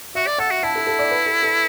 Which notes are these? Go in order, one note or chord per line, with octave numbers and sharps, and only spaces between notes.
F#4 E5
D5
A4 F#5
F#4
E4 A5
A4
A4
D5
B4
A4
A4